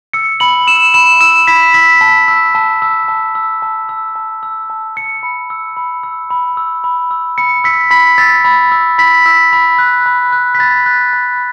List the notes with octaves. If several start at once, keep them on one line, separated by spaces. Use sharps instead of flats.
E6 C#7
B5 F#7
E6 E7
B5 E7
E6 E7
B5 B6
E6 B6
A5
E6
A5
E6
A5
E6
A5
E6
A5
E6
A5
E6 C#7
B5
E6
B5
E6
B5
E6
B5
E6
B5 C#7
E6 B6
B5 B6
E6 A6
B5
E6
B5 B6
E6
B5
F#6
B5
F#6
B6
B5 A6
F#6
B5